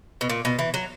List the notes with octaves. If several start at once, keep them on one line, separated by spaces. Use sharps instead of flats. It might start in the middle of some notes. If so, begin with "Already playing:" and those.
B2
A#2
B2
E3
F#3